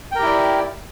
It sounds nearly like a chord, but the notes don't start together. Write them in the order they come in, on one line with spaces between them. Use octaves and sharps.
G5 A#4 G4 E4 D5